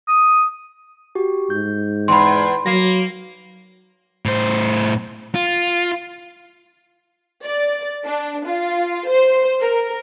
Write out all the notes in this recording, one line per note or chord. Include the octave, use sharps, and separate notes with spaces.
D#6
F#4 G4
G#2 G6
E2 B5 C6
F#3 A#3 A#6 C7
A2 C5
F4
D5
D4
F4
C5
A#4